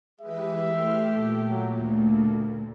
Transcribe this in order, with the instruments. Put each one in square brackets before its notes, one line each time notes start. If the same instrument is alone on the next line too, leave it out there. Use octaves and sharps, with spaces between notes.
[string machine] E3 G4 B4 [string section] G#3 [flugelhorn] E5
[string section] A3 G4 [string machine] C6 F6
[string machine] A#2
[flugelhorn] F#3
[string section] D2 [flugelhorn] A#3